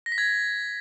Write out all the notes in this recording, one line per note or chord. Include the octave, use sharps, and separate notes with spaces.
A#6
B6
G#6